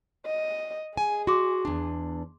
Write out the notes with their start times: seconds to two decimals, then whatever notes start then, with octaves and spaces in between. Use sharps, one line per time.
0.26 D#5
0.97 G#4 G#5
1.27 F#4 C6 D6
1.65 E2 D4